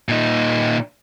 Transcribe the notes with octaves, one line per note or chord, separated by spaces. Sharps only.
A#2 D#4